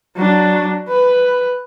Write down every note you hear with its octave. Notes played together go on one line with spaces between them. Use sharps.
F#3 D4
B4